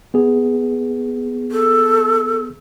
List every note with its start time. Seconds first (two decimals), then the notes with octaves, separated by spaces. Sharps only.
0.14 B3 G#4
1.51 A4